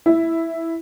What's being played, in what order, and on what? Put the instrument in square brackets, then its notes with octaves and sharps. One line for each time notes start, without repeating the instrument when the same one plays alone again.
[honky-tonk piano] E4